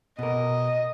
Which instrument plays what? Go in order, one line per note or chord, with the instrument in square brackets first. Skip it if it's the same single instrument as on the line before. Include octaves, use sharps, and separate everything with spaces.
[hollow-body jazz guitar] B2 A#4 [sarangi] D#5